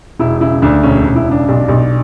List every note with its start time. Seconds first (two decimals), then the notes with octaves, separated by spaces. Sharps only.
0.19 E1 E4
0.41 C#3 E4
0.62 D2 D4
0.83 E1 C#4
1.00 E1 C#4
1.16 E4
1.27 C#3 D4
1.48 B1 D4
1.68 B1